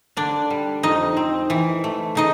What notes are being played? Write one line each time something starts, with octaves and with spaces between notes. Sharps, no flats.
D3 D4 D5
G3
F2 D#4 D#5
C4
E3
A3
C#3 D#4 D#5